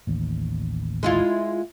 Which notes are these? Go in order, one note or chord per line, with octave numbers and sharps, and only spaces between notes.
A1 D#2
G#3 E4 F4